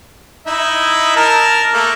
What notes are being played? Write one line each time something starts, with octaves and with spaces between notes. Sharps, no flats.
D#4 E4 E5
A#4 A5 A#5
A3 A#3